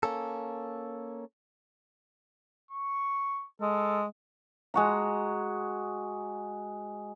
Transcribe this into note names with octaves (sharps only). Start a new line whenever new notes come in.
A#3 C#4 A4
C#6
G#3 A4
G#3 F#4 A#5